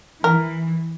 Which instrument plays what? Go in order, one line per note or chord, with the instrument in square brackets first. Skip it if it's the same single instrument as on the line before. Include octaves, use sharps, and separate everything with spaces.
[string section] E3 [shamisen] A#4